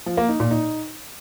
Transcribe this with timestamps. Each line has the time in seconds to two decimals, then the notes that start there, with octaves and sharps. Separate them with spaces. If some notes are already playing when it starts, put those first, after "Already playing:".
0.06 F3
0.17 A#3
0.29 D#4
0.40 A#2
0.51 D#4